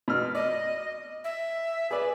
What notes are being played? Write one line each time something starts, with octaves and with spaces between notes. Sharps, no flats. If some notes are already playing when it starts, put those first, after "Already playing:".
B2 F6
D5 D#5
E5
G#4 B4 D5